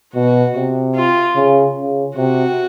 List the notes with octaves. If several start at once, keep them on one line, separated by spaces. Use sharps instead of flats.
B2 F#4
C3
F4
C#3
C#3
C3 F#4